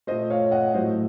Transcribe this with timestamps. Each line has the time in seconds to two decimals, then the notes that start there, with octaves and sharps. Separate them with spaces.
0.07 A3 C5 D#5
0.11 A#2
0.30 C#5 F5
0.52 D#5 F#5
0.74 A2 F#3 A3 C5 D#5